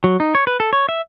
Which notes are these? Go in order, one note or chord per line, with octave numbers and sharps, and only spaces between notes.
F#3
D#4
C#5
B4
A4
C#5
E5